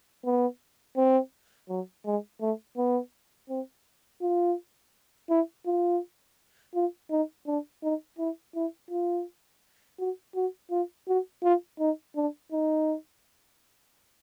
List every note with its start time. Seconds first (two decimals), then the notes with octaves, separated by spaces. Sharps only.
0.25 B3
0.96 C4
1.69 F#3
2.05 G#3
2.41 A3
2.77 B3
3.49 C4
4.21 F4
5.30 E4
5.66 F4
6.75 F4
7.11 D#4
7.47 D4
7.83 D#4
8.18 E4
8.55 E4
8.91 F4
9.99 F#4
10.35 F#4
10.71 F4
11.08 F#4
11.43 F4
11.79 D#4
12.16 D4
12.52 D#4